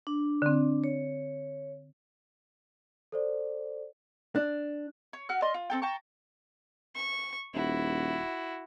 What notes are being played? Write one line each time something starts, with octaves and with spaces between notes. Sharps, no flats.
D4
D3 C4
C#5
A4 C5 D5
D4
C#5
F#4 F6 F#6
D5 D#5 C6 F6
F4
C4 A4 G5
G5 A5 A#5 C#6
C#6
D#1 E4 F#4